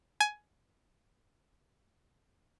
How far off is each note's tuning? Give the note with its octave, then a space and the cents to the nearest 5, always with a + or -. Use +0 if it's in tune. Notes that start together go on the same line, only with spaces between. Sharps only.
G#5 +15